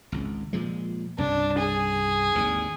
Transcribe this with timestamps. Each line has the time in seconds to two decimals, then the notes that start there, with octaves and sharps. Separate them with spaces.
0.12 G#1 C#2
0.53 A#2 F3 G#3
1.18 C2 G2 C#3 D4
1.58 G#4
2.35 G#1 D#2 D3